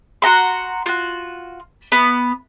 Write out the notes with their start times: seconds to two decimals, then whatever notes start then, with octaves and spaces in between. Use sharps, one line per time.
0.22 F#4 F#5 A#5 C6
0.86 F4 F#4
1.92 B3